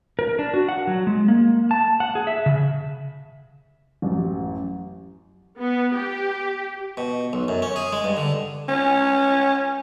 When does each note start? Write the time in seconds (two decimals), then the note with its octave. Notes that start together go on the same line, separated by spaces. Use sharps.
0.19 A#4
0.39 D4
0.54 F#4
0.69 F#5
0.87 F#3
1.07 G#3
1.28 A#3
1.71 A5
2.00 F#5
2.15 G#4
2.27 E5
2.46 C#3
4.02 A1 F#2
5.59 B3
5.95 G4
6.97 B2
7.33 B1
7.48 F#2
7.62 C#4
7.76 G#4
7.92 G#3
8.04 G2
8.17 D3
8.69 C#4